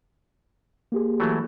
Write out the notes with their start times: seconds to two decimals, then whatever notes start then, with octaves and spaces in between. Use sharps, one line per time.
0.92 A#3 G4 G#4
1.20 E3 F#3 A3